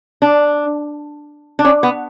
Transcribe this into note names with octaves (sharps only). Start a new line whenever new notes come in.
D4
D4
C#4
B3